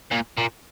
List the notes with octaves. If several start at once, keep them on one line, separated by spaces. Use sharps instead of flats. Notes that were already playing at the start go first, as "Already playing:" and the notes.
A#2
A#2